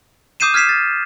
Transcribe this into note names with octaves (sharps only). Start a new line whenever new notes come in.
D6 D#6 G6 C7 D#7 E7
F6 G#6 B6 C7 E7
A6